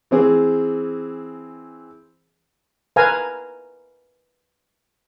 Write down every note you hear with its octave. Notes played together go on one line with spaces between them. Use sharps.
E3 C4 G#4
A#4 B4 F5 G#5 A#5